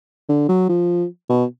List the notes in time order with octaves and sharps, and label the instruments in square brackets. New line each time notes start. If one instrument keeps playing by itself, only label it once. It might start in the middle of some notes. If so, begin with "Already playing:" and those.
[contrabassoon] D3
F#3
F3
B2